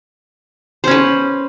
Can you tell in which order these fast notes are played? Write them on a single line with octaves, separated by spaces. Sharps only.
C5 C#4 B4